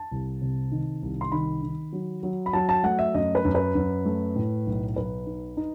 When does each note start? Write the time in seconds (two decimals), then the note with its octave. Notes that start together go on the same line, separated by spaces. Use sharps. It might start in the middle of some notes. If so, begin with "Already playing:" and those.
Already playing: A5
0.11 C2
0.42 C3
0.72 D#3
1.02 C2
1.21 C6
1.32 D#3 B5
1.62 D#3
1.93 F#3
2.23 F#3
2.46 B5
2.53 F#3 A5
2.69 A5
2.83 A3 F#5
2.99 E5
3.14 F#2 D#5
3.35 B4
3.45 F#2
3.55 B4
3.75 F#2
4.05 A3
4.36 A2
4.67 B1
4.96 B1 B4
5.26 D#4
5.57 D#4